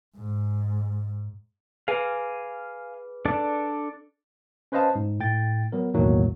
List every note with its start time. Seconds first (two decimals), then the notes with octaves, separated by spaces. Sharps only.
0.16 G#2
1.88 G#4 B4 F5 G#5
3.25 D4 A4 D5
4.72 C#4 B4 C5 D#5 F5 A5
4.95 G#2
5.20 A2 G5 A6
5.72 F#3 B3 A#4
5.94 B1 E2 A2 D#3 F#3 A#3